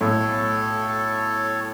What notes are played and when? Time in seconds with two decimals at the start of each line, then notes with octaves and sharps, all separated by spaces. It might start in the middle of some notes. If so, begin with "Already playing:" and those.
0.01 B1 A2 A4 C#5